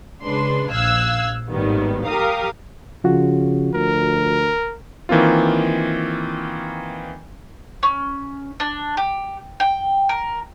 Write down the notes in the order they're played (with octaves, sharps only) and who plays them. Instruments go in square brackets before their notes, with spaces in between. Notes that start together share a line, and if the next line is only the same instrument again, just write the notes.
[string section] C#3 G#3 D4 B4 C6
A#1 F5 E6 F#6 G#6
G#1 A2 D#3 G3 B3
G4 A#4 F5 A#5 D#6
[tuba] C#3 [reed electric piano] F3 F4 F#4
[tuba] D2 [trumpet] A#4
[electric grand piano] D#3 E3 A#3 C4 F4
[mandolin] C#4
D4
G4
G5
A#4